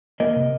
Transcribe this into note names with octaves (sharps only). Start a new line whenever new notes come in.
A#3 A#4 D#5
C3